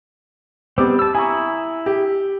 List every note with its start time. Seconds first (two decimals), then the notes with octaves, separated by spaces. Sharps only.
0.78 G3 B3 C4 D6
0.99 A5 E6
1.15 E4 G#5 A#5 C#6 D#6
1.86 G4